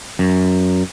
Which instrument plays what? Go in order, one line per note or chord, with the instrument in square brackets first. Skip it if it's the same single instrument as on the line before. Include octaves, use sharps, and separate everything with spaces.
[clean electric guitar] F#2